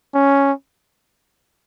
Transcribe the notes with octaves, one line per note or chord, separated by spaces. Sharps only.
C#4